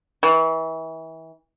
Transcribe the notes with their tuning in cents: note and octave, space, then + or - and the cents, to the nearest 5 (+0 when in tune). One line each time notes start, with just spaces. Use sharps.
E3 -30